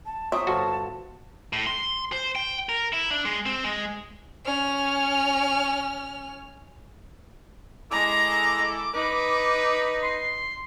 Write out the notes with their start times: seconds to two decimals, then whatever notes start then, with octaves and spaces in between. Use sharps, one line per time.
0.06 A5
0.32 F#3 C4 E5 D#6
0.47 G1 F#4 C5 A5
1.53 A2
1.67 C6
2.12 C5
2.35 G5
2.69 A#4
2.93 E4
3.11 D4
3.25 G#3
3.46 C4
3.64 G#3
4.46 C#4 F6
7.91 G#3 E4 A4 A#5 D6
8.94 D#4 B4
10.02 C6